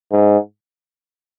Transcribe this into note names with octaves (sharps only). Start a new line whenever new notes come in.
G#2